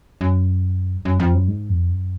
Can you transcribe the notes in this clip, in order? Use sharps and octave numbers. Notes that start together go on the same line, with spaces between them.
F#2
F#2
F2
F#2
G#2
F2
F#2